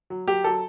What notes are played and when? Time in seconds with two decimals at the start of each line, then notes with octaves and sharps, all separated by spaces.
0.10 F#3
0.28 F#3 G4
0.44 F#3 A4